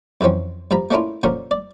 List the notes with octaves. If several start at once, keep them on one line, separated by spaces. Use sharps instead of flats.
F2 E3 F#3 C4 C#4
G2 F3 A#5 B5
A3 A#3 C#4 D4 E4 F4
A#2 D3 F3 C#4 A#4
D5